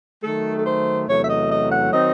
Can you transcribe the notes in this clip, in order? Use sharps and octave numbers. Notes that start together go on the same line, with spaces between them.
D#3 F#3 A3 A4
A4
C5
E2 C3 F#3 A3 C#5
E5
D#5
D#5
F#5
D#3 F#3 C4 D#4 D#5